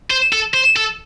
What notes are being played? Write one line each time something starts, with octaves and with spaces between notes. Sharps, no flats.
C5
A4
C5
A4